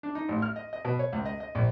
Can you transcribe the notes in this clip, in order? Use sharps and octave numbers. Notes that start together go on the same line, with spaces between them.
D4
D#4
A1
F6
D#5
D#5
B2
C#5
C#2
D#5
D#5
A#1